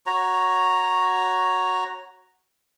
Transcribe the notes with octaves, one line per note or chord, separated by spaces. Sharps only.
F#4 C#5 A#5